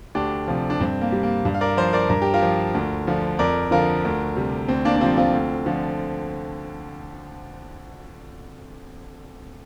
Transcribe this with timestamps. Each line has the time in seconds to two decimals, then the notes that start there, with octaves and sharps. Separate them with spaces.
0.15 D2 D4 G4
0.48 C3 F3
0.70 D4
0.80 G2 C4
1.01 A#3
1.12 G3
1.23 A#3
1.45 G2
1.54 F5
1.61 A#4 D5
1.77 F3 C5 F5
1.93 A#4 D5
2.10 G2 A#4
2.22 G4
2.34 F4 A#4
2.42 F3
2.74 D2
3.07 D3 F3
3.39 F2 A#4 D5
3.71 D3 F3 F4 A#4
4.05 D2
4.36 C3 G3
4.68 D2 C4
4.85 A#3 D4
4.96 D4
5.01 C3 F3 C4 F4
5.17 C4 F4
5.33 D2
5.66 D3 F3